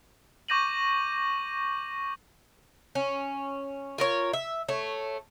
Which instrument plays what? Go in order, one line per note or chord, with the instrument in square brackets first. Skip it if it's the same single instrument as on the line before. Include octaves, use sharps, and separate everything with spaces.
[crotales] C#6 D6 G6 A#6 D#7 F#7
[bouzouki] C#4
F4 A#4 C#5
E5
A3 C#5